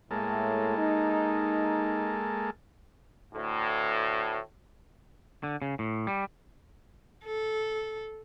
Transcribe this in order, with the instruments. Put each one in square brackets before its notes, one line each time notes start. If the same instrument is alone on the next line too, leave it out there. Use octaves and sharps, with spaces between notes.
[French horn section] A2 [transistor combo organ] G#3 A#3 A4
[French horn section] D#4
[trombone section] D2 A2
[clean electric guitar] D3
C#3
A2
G3
[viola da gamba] A4